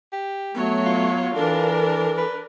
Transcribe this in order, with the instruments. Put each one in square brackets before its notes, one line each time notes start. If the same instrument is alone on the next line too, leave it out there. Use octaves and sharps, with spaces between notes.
[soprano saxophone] G4
[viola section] F#3 C#5 [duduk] A3 [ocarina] B3
[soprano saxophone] F4
[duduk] E3 [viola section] D4 A#4 [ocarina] A4
[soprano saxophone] B4